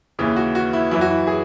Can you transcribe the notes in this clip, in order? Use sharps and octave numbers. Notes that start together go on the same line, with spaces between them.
D#2 C#3 E3
F#4
F#4
E4
F#2 E3 E4
F#4
E4
G#4